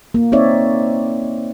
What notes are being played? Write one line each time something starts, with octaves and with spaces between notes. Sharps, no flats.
A#3
C4 D#4 C#5 D5 E5